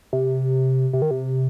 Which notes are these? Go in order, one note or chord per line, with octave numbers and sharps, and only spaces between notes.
C3
C3
D#3
C3